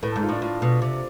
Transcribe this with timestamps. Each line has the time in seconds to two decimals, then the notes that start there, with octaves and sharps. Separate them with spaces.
0.02 A2 B4
0.12 A4
0.16 G#2
0.23 F4
0.29 A2 D4
0.42 A2 F4
0.62 B2
0.82 C3